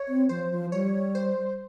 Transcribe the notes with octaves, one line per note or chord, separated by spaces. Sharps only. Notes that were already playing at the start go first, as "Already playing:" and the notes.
Already playing: C#5
C4
F3 C5
F3
G3 C#5
C5